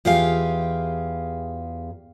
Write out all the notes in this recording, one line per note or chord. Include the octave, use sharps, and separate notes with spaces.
E2 F4 G4 G#4 F5